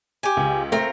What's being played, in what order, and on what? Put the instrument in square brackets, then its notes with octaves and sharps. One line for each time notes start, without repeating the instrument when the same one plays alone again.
[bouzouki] G4 G#5
[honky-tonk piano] C#2
[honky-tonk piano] A3 [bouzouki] C4 F4 A#4